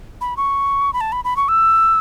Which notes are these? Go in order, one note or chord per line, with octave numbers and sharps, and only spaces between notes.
B5
C#6
B5
A5
B5
B5
C#6
E6